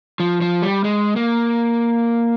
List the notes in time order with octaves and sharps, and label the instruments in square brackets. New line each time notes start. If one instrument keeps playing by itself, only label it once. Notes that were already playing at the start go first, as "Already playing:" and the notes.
[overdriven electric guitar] F3
F3
G3
G#3
A#3